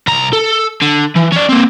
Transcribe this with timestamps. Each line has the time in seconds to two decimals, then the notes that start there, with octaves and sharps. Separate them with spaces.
0.08 C2 A#5
0.33 A4
0.82 D3
1.16 E3
1.32 C#4 D5
1.49 A#3 C4